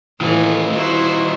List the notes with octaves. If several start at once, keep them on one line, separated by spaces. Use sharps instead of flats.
A2 D#3 E3 A3 F4
E4 F#4 C5